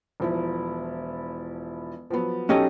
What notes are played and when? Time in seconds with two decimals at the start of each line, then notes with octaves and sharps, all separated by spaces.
0.20 E1 F3 E4
2.10 F3 F#3 B3
2.49 B1 C#4 D#4 G4 A4 D#5